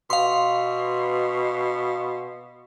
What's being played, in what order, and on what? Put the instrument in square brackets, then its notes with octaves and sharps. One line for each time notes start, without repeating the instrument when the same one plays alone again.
[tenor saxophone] B2 [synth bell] F5 C6